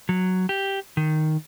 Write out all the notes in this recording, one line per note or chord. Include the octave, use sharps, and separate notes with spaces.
F#3
G4
D#3